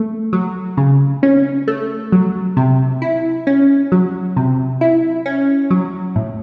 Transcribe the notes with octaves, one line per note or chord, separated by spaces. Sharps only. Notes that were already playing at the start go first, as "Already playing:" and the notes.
Already playing: A3
F#3
C#3
C#4
A3
F#3
C3
E4
C#4
F#3
C3
E4
C#4
F#3
A2